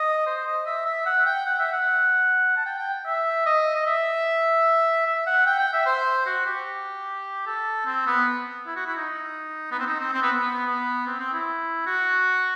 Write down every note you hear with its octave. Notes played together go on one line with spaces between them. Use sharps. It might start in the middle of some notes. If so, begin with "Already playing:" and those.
Already playing: D#5
C5
D#5
E5
E5
F#5
G5
F#5
E5
F#5
A5
G5
G5
E5
D#5
D#5
E5
E5
F#5
G5
G5
E5
C5
F#4
G4
A4
C4
B3
E4
F#4
E4
D#4
B3
C4
D#4
C4
C4
B3
B3
B3
C4
C4
E4
F#4